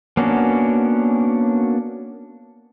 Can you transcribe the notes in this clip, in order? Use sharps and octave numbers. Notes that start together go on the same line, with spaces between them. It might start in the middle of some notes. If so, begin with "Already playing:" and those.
A#3 B3 C#4 D4 F#4